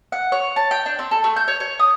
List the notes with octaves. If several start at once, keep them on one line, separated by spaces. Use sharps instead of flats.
F#5
C#5
A5
G5
D4
C4
A4
A3
G6
C#5
C#5
D#6